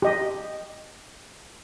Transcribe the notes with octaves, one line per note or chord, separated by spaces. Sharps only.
G4 D#5